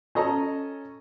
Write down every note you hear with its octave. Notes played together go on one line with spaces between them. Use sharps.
C#4 A4 D#5 A#5